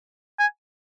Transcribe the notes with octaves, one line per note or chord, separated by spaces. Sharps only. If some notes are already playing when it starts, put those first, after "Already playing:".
G#5